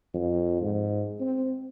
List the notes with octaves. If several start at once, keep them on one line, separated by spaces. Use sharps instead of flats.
F2
G#2
C4